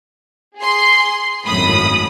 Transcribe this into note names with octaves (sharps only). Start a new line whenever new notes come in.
G#4 C6
G#1 F#2 A2 B5 D#6